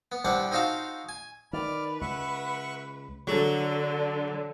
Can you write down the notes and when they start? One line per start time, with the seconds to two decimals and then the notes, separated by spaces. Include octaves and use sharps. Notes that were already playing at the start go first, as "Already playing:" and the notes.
0.12 B3
0.25 C2 G3 C4 D4 D5 F#5
0.52 C4 D#4 F4 F#4 F5 A5
1.09 G#5
1.53 D#3 B4 D5 F6
2.01 C#2 E5 F#5 C#6
3.27 D3 F#3